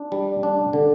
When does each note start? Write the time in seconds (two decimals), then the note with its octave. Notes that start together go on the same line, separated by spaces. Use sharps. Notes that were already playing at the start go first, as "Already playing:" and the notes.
Already playing: D4
0.12 G3
0.43 D4
0.73 D3